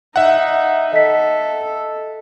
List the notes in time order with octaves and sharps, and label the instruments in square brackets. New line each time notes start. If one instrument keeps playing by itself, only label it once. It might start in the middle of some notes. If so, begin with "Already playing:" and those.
[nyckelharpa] D#4 [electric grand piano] E5 F#5
[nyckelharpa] A4 [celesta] D#5 B6